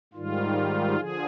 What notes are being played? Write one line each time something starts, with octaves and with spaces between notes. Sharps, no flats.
G#2 D#3 G3 F4
D3 F3 G#4